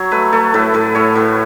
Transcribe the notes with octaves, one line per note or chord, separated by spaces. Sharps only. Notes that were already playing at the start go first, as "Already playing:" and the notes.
Already playing: F#3 C#5
A3 B4
A3 A4
A2 B4
A2 B4
A2 C#5
A2 B4